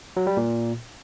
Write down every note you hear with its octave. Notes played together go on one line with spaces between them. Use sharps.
F#3
G3
A#2